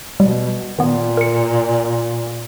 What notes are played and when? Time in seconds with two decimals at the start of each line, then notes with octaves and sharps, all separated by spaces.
0.20 B2 G3
0.79 A#2 D#3 B3
1.17 A#4 C#7